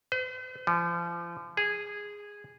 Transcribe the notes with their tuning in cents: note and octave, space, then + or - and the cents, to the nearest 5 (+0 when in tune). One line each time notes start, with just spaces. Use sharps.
C5 -45
F3 -35
G#4 -10